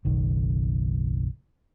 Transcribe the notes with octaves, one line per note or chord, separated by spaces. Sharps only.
F#1 B1 D#3